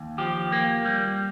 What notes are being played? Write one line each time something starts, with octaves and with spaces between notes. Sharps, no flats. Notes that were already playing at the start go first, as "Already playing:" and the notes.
Already playing: D#2
F3 G4
A#3
G3